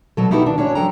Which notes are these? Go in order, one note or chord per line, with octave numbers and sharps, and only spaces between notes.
B2 F#3 A4
B3 D#4 E4 F#4 G4 B4
D#3 D4
C#4 D4 F#4 C#5
F3 F#3 A4 G5 A#5